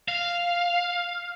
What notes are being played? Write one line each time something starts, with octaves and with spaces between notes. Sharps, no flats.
F5